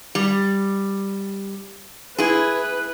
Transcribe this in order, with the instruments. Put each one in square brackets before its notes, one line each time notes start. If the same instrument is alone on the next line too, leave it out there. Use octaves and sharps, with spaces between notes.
[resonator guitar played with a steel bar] G3
[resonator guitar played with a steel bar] E4 G#4 [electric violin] B4